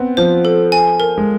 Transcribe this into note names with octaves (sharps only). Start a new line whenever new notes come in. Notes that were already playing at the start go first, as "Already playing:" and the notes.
Already playing: B3 C4
F3 C5
A4
G#5
A#4
G#3